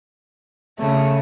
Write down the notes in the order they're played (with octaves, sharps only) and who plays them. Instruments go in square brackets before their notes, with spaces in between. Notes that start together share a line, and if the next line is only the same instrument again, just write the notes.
[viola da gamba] C#3 [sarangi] A3